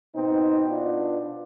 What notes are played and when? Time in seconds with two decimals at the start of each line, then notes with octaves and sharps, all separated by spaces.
0.15 B2 B3 C4 D#4
0.69 D4 F4